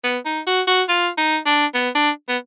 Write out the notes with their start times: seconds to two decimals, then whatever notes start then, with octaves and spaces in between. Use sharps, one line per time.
0.04 B3
0.26 D#4
0.47 F#4
0.68 F#4
0.89 F4
1.18 D#4
1.46 D4
1.74 B3
1.95 D4
2.29 B3